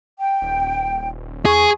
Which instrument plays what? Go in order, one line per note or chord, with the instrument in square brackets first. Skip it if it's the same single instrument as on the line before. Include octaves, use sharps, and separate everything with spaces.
[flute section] G5
[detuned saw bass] D#1
[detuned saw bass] E2 [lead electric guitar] G#4 [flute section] C#6